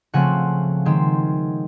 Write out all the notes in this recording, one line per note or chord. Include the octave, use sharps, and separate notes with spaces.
C#3 F3 A3 C4 F#5 G#5
D#3 G#3 C4